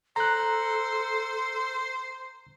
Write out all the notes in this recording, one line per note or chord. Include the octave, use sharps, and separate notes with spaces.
A4 C5 A#5 F#6